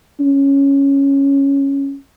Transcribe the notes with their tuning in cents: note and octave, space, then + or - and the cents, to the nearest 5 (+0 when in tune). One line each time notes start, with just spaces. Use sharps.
C#4 +0